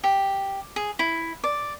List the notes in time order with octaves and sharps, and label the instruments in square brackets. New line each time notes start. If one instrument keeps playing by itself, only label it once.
[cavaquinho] G4
G#4
E4
D5